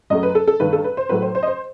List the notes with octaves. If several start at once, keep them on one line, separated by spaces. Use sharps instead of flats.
F#2 F#3 A3 D#5
B4
A4
A4
G2 D#3 A3 B4
A4
B4
C5
A2 F#3 A3 B4
C5
C5
D#5
C5